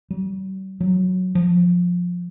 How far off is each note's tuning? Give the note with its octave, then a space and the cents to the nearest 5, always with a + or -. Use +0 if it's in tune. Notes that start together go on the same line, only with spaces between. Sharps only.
G3 -45
F#3 -5
F3 +20